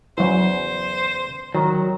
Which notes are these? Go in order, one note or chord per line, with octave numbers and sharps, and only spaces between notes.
E2 C#3 F#3 E4 C5
D#3 F#3